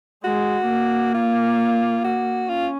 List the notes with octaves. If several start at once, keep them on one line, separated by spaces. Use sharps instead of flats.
G#3 F#4
A#3
F4
F#4
C#4 F4